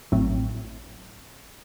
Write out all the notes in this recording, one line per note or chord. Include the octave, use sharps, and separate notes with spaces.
A1 A2 F#3 A3 C4